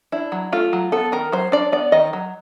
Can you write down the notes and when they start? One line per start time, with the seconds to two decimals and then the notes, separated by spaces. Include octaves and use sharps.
0.12 D4 E4
0.32 F#3
0.52 A3 F4
0.73 F#3
0.92 B3 A4
1.12 D#3 A#4
1.32 F#3 C5
1.52 D4 D5
1.72 B3 D5
1.92 D#3 D#5
2.13 F#3